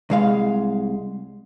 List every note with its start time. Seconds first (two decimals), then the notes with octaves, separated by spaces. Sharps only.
0.10 C2 G#3 F5